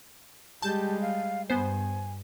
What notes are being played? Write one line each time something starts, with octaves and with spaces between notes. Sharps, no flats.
G3 G#3 G4 A5 G6
F5
G2 B3 C5 G#5